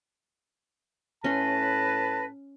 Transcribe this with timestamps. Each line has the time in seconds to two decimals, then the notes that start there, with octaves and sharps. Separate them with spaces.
1.24 A2 C#4 B4 A5 C6 A#6